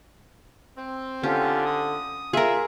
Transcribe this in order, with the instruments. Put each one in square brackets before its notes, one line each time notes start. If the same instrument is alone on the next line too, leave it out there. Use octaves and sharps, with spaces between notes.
[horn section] C4
[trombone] D3 [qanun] C#4 [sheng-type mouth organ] F4 G4
[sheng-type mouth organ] D#6
[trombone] F4 [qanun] G#4 A#4 [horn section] E5